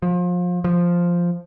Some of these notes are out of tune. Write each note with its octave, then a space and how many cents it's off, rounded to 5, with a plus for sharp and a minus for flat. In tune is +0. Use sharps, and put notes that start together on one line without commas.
F3 +30
F3 +0